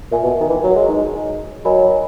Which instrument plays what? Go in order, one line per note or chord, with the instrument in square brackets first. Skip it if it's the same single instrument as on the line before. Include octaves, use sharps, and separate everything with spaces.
[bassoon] A#2 [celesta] A#4 E5 G#5
[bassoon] B2
D#3
E3
F#3
G#3
[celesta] D#4 G#4 D#5
[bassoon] F#3 [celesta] A#4 D#5 G#5 B5